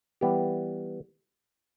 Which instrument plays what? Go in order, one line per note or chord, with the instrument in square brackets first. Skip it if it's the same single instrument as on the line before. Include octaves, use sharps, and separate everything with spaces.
[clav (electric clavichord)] E3 G3 B3 G4